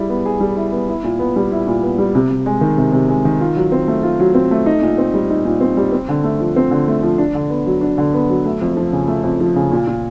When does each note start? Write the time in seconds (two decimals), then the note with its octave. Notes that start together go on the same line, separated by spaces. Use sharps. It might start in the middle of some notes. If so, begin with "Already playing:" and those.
Already playing: G3 E4 G#4
0.09 B3
0.25 G#4
0.40 G3
0.56 E4
0.72 B3
0.88 E4
1.04 A#2
1.19 B3
1.36 G3
1.52 E4
1.67 A#2
1.83 B3
1.98 G3
2.15 C3
2.30 C3
2.46 G#3
2.61 D#3
2.78 C3
2.92 C3
3.09 G#3
3.25 D#3
3.40 F4
3.56 F#3
3.72 C4
3.88 A3
4.03 F4
4.20 F#3
4.34 C4
4.51 A3
4.66 D#4
4.82 A#2
4.98 C4
5.14 G3
5.30 D#4
5.45 A#2
5.61 C4
5.77 G3
5.92 C4
6.09 D3
6.24 A3
6.40 F3
6.56 C4
6.71 D3
6.88 A3
7.02 F3
7.18 D4
7.35 D3
7.50 B3
7.66 F#3
7.81 D4
7.98 D3
8.14 B3
8.29 F#3
8.46 A3
8.61 F2
8.77 F3
8.92 C#3
9.08 A3
9.24 F2
9.40 F3
9.56 C#3
9.72 A#2
9.87 A#2